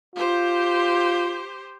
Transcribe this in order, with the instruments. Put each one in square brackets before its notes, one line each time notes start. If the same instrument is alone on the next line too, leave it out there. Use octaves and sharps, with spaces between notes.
[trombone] F4 [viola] G4 C5